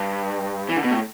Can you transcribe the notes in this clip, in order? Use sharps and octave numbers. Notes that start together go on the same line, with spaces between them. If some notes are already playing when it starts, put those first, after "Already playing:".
Already playing: G2
E3
D3
B2
A2